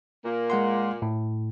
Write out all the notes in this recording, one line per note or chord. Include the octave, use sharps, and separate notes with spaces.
A#2 A#3
G#3 F#5 C6
A2